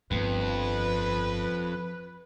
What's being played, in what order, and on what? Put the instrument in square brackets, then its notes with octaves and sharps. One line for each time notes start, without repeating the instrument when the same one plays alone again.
[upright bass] G1 D#3 [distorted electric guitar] F2 [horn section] B4